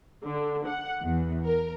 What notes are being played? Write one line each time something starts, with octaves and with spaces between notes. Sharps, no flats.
D3
F#5
E2
A#4